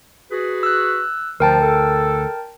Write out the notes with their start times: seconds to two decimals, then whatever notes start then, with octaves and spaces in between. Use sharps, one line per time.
0.31 F#4 G#4 B4
0.63 E6 F#6
1.40 D2 F3 A#4 G5 A5
1.61 A4